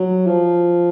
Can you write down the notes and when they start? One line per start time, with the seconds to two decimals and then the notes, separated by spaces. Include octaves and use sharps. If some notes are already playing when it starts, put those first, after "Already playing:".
Already playing: F#3
0.26 F3